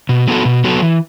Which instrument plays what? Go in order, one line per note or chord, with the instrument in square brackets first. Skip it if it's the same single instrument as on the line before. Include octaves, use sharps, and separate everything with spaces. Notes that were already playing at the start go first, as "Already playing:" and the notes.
[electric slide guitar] B2
F#3 B3 F#4 A4
B2
F#3 B3 F#4 A4
E3